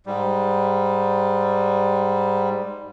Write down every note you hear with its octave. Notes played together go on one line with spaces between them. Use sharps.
G#2 G3